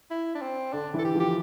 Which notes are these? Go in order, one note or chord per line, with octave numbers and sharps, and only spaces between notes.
E4
D4
C4
D3 D4
E3
A4
G4
F3 G4